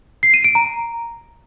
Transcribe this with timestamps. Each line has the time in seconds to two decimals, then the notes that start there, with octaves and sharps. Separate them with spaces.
0.23 C7
0.34 D#7
0.44 D7
0.55 A#5